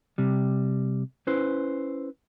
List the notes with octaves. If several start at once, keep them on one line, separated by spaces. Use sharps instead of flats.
C3 G3
C#4 E4 B4 C5